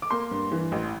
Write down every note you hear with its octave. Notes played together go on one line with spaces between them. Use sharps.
D6
A#3 C6
G2
E3
A1